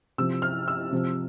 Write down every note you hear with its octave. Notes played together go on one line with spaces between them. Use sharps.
C3 F3 E6
F6
E6
C3 F3